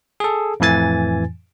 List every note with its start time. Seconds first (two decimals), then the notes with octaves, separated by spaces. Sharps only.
0.20 G#4 A4
0.60 F2 A2 E3 G#5 A6